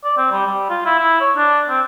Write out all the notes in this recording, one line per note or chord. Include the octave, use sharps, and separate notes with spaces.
D5
C4
G3
G3
F4
E4
E4
C#5
D4
C4